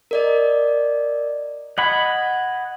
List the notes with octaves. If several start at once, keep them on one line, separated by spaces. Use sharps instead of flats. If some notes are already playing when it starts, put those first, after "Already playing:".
A#4 D5 D#5
D#5 F#5 B5 G#6